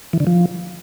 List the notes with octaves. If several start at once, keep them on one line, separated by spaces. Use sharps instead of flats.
E3
D3
F3